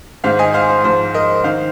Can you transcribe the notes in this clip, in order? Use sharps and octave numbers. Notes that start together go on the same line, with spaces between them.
G#2 D#3 C5 F5
D#5 G#5
C5 F5
C5
G#2 F3 C5
A#4 D#5
D#3 C5 F5